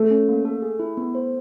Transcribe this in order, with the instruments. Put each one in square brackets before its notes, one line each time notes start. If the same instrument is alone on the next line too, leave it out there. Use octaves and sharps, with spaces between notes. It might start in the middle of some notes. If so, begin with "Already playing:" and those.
Already playing: [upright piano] A3
[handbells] C#4
A#3
A4
G#4
E4
B3
C5